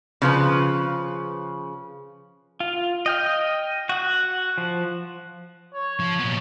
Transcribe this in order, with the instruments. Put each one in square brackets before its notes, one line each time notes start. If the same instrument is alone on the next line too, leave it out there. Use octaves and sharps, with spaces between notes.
[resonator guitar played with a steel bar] C#3 F3 B4
[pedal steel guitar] F4
D#5 G5 F6
F#4 F#5
F3
[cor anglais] C#5
[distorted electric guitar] F3
A#2 B3